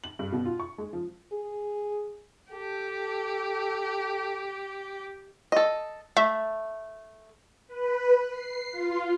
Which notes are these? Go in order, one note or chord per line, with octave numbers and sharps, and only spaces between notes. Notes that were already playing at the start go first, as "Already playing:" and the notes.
F#7
G2
B2
F4
C#6
G#3
F3
G#4
G4 A4
A4 D#5
A3 E5
B4
C7
F4